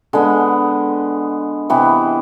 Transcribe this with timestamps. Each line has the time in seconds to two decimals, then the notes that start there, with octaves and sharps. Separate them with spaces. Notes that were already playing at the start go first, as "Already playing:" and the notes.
0.13 D3 G#3 B3
1.70 C3 E3 B3